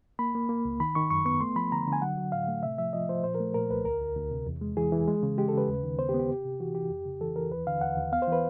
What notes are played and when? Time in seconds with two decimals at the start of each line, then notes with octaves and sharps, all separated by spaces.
0.19 A#3 B5
0.35 A#3
0.49 A#3
0.65 C#2
0.80 D#3 B5
0.95 D#3 C#6
1.11 F#2 C#6
1.26 B3 C#6
1.41 A3 C6
1.56 F3 B5
1.72 D3 A#5
1.87 D3
1.93 G#5
2.02 F#3 F#5
2.18 F#3
2.32 A2 F5
2.48 A3
2.63 C3 E5
2.78 F3 E5
2.93 F3 D#5
3.09 F3 C5
3.24 A#2 C5
3.35 A#4
3.40 A3
3.54 A#2 A#4
3.70 C2 B4
3.85 D2 A#4
4.00 D2
4.16 D2
4.31 C3
4.46 E2
4.61 G#3
4.77 E3 G#4
4.92 E3
5.07 G#3
5.23 C#3
5.38 G#3 G4
5.48 A4
5.53 C#3 B4
5.68 D#2
5.83 D#3
5.98 B3 C5
6.09 G4
6.14 B3
6.19 G4
6.29 C3
6.45 C3
6.60 E3 F#4
6.75 E3 G4
6.90 F2
7.05 C#3
7.21 E3 A4
7.36 E3 A#4
7.51 D#2 B4
7.67 D3 F5
7.81 D#2 F#5
7.97 D#2
8.12 B3 F5
8.22 C5
8.27 E3 B4